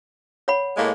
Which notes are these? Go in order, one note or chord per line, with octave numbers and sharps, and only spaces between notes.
C#5 F#5 B5
A2 G#3 A#3